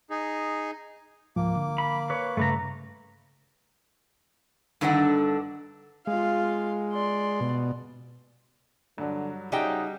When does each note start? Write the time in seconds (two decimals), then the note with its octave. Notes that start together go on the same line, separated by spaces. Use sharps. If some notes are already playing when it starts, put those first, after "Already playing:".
0.10 D#4 G#4
1.36 C#2 G#2 F3 A#3 D6
1.56 D3
1.78 B5
2.10 B4 C#5
2.37 G2 C#3 A3 B4 A#5
4.81 G2 D3 D#3 D4 A4 F#5
6.07 G#3 F4 F5
6.93 D5 C6
7.40 B2
8.98 G2 D3 F#3
9.52 C#3 G3 D#4 F#4 G#4 D#5 E5 G5